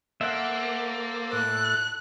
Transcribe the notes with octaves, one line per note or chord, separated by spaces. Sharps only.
A#3 A4 C5 E5 F#5
A2 E4 A4 F#6